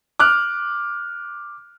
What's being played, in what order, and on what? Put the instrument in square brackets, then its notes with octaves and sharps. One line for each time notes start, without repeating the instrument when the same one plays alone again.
[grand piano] D6 F6 F#6